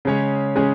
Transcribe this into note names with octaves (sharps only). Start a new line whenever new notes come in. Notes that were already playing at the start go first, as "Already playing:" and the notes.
C#3 G#3 C#4 G#4 C#5
C#3 G#3 C#4 G#4 C#5